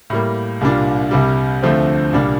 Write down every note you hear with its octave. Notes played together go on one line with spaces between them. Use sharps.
A2 G3 A#3
C2 A#2 G3 D4 F4
C2 C3 G3
D2 D3 F3 A3 C4
C2 A#2 G3 D4